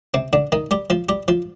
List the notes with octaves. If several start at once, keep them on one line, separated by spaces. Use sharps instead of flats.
C3 C4
D3 D4
D#3 D#4
G3 G4
F3 F4
G3 G4
F3 F4